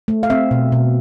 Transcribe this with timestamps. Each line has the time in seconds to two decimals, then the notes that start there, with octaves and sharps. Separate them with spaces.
0.08 A3
0.23 F5
0.30 C4 E5
0.51 B2
0.72 B2